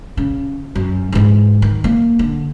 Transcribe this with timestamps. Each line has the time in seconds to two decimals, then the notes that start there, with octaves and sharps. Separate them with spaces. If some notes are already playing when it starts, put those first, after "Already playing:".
0.17 C#3
0.75 F#2
1.12 G#2 E3
1.62 D#3
1.84 A#3
2.19 D3